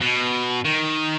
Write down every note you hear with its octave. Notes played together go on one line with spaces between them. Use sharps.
B2
D#3